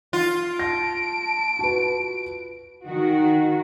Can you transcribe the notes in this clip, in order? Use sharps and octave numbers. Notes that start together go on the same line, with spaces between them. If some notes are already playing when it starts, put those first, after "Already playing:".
F4
A5 A#6 D7
F#4 B4
D#3 F#4